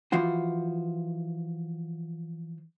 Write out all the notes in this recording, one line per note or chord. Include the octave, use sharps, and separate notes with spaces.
E3 F3 F4 F#4